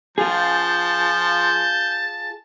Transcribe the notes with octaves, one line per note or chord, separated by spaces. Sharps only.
F3 F4 G#4 A5 G6